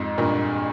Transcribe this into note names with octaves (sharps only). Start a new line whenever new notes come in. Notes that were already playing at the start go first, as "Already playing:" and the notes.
Already playing: F2 G#2
G2 A#2